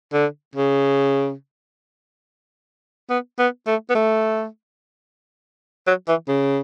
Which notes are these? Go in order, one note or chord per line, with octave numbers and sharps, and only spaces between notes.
D3
C#3
B3
B3
A3
B3
A3
F#3
E3
C#3